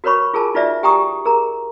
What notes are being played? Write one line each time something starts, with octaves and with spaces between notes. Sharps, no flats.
F#4 A#4 B4 C#5 B5 C#6
F4 G#4 A#4 G#5 A5
D#4 F4 F#4 B4 D5 E5
G4 G5 G#5 A#5 C#6 D#6
G#4 A#4 A#5